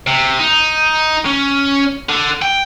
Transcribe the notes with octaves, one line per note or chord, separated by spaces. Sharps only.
C3
D#4
C#4
D3
G5